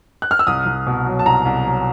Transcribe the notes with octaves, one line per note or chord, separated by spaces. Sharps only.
F#6
F6
E6
C2 D#6
C2
B2
F#3
A5
C2 A#5
C2
F#3